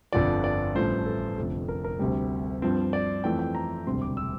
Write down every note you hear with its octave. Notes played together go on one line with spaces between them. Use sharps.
G1 F2 D3 F3 D5
D5
A1 G2 F3 A3 C5
A4
F1 F2 D3
A#4
A#4
D2 C3 G3
G2 F3 C4
D5
F2 E3 A3 C4 G5
G5
A#5
E1 D2 C3 G3 C4 C6
D6
E6